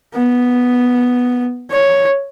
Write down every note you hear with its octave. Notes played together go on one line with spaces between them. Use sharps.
B3
C#5